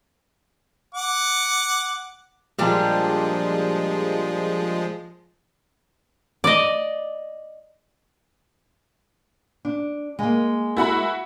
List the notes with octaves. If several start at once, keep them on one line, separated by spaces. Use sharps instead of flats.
F#5 D6
A#2 F3 G3 G#3 D4
D5 D#5
D4
G#3 A#3
E4 F#4 B5